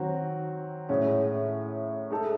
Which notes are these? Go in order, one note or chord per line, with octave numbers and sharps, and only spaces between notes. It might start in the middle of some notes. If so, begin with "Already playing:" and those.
Already playing: D#3 F#3 C4 F#4
A2 G#3 C#4
G#3 D#4 A4